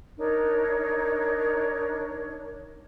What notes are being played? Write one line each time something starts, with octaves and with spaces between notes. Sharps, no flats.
D4 D#4 A#4 C#5